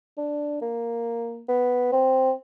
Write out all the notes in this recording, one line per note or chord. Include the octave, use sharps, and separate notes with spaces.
D4
A#3
B3
C4